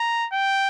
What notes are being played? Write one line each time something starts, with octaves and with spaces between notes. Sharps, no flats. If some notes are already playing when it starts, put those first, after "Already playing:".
Already playing: A#5
G5